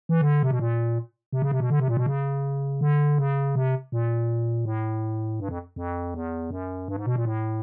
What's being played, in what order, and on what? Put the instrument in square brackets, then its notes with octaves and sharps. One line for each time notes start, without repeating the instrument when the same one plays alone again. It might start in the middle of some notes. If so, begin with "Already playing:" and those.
[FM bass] E3
D3
C3
B2
A#2
C3
C#3
C3
B2
D3
C3
A#2
B2
C#3
D3
C#3
C3
A#2
A2
G2
F2
F2
E2
F#2
G2
G#2
B2
A#2
A2